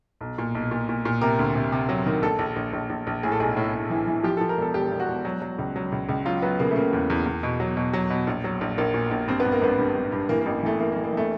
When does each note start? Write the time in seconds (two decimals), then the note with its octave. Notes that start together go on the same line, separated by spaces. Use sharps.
0.21 B1
0.38 A#2
0.55 B1
0.71 A#2
0.89 A#2
1.05 A#2
1.21 C3 A#4
1.39 D2
1.55 C3
1.72 C3
1.89 F#3
2.06 D#3
2.22 A#1 A4
2.39 A#1
2.56 A#1
2.73 A#1
2.90 A#1
3.07 A#1
3.23 A2 G#4
3.32 A4
3.40 B1 G#4
3.56 A2
3.74 A2
3.90 E3
4.07 E3
4.24 F3 G4
4.37 F3 A4
4.49 A#4
4.57 E1 A4
4.74 E1 G4
4.92 E1
5.00 F#4
5.08 E1
5.25 F#3
5.42 F#3
5.58 C#2
5.76 F#3
5.92 C#2
6.09 C#2
6.26 F#3 F4
6.42 F#3 B3
6.59 C#3 A#3
6.70 A3
6.76 C#3 A#3
6.93 E2
7.10 E2
7.26 E2
7.43 B2
7.60 F#3
7.77 B2
7.93 F#3
8.10 B2
8.27 A#1
8.44 F#3
8.61 A#1
8.77 A#1 A#3
8.94 A#2
9.11 A#1
9.27 G2 C4
9.40 B3
9.45 G2
9.52 A#3
9.62 G#1 B3
9.78 G2
9.95 G#1
10.12 G2
10.29 E3 A#3
10.41 A#3
10.46 A1
10.63 E3 A3
10.79 E3 A#3
10.92 A#3
10.96 E3
11.04 A#3
11.12 E3 A3